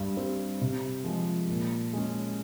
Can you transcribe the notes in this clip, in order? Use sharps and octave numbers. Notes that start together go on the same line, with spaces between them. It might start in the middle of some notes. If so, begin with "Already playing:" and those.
Already playing: G2
G3 C4
C3
F3 G#3
A#2
G#3 C#4